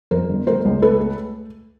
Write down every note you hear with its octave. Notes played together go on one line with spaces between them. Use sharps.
F2 A#4 C5
G1
A3 A#4 C5
C#2
A3 A4 B4
A3